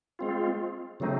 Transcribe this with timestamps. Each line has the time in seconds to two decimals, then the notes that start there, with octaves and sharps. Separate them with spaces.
0.19 G#3 C4 F4
1.00 C#3 F#3 A3 C4 D#4